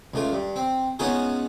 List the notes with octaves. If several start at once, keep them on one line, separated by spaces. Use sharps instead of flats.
C#2 A3 F4
G2
C4
G#3 B3 C#4 D#4 F4 G#4